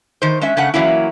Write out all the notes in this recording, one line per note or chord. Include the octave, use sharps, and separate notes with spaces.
D#3 C5
G#3 C#4 E5
C#3 A3 C#4 F#5
E3 F#3 A#3 C#4 E4